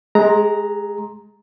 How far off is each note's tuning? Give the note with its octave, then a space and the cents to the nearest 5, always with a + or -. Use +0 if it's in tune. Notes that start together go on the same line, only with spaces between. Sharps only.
G#3 +25 G#4 -40 A#5 +0